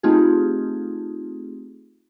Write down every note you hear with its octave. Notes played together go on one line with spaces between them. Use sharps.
A3 C4 D#4 F4 G4 G#4